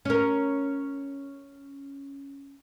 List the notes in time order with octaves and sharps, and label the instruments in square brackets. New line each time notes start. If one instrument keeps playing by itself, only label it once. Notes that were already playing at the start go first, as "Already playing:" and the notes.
[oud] C#4 A#4